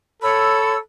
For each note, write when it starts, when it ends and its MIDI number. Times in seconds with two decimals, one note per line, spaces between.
0.22 0.80 69
0.22 0.76 73
0.22 0.75 83
0.22 0.76 88